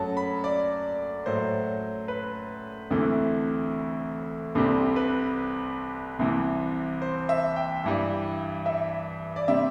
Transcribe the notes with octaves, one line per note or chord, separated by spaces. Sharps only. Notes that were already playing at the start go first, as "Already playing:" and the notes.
Already playing: F#2 F#3 A3 A5
B5
D5
A2 F#3 A3 C5
B4
D2 C3 E3 A3
C2 C3 G3 A4
B4
C2 C3 E3
C5
E5
G5
G2 E3 G3
E5
D5
C3 G3 E5